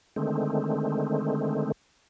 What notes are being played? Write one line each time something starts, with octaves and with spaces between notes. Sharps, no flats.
D3 D#3 G#3 A3 C4